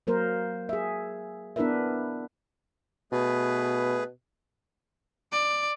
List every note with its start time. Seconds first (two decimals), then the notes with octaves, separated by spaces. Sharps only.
0.07 F#3 A#3 A#4 C5
0.69 G#4 E5
1.56 B3 D4 E4 A#4 B4 E5
3.12 B2 A3 G#4 B4
5.32 D5